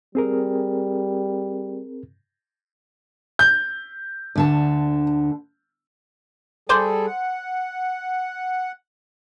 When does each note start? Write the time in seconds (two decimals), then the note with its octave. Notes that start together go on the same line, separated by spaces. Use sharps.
0.15 G3 C4 G#4 A#4
3.39 G6
4.36 D2 D3 A5
6.69 G3 G#4 A4 C5 D5
7.06 F#5